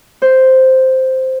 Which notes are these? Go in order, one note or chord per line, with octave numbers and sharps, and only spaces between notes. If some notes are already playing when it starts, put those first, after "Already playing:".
C5